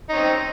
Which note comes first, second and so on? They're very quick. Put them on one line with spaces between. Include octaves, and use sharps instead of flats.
D#4 C#4 C4